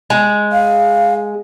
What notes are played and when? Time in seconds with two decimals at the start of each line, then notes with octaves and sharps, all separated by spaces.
0.10 G#3
0.52 F5